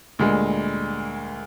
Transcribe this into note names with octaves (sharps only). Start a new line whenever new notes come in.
D2 A#2 G3 G#3